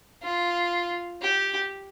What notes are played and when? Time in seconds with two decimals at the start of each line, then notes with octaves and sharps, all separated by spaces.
0.23 F4
1.21 G4